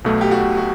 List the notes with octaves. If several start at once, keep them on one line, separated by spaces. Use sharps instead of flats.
B1 B2 A3
G4
F#4
F#4